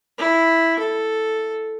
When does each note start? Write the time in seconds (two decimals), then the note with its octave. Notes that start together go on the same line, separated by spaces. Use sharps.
0.18 E4
0.79 A4